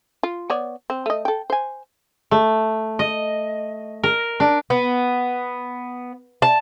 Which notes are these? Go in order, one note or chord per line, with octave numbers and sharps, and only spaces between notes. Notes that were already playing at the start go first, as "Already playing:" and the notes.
F4
B3 C#5 D5
C4
A3 D#5
A4 G5
C5 G#5
A3
D#5
A#4
D4
B3
A5